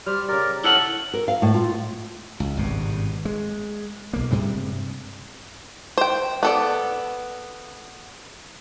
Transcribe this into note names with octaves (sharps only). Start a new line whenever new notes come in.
G3 C5 D5 F6
C#3 G4 A#4 D5
E4 A4 C#5 F#5 F6 F#6
A#4
F5
A2
F4
C#2
G#1 G2 B2
G#3
B1 A#3
G2 C3 G3 G#3
C5 G5
B3 A4 D5